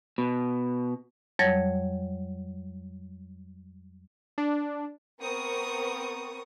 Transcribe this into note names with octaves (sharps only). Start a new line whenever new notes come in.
B2
F2 F#3 G3 C#5 G#6
D4
B3 C4 A#4 C#6 D#6